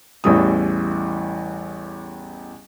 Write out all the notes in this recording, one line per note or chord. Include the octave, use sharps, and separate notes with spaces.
A1 E2 E3 G3 D#6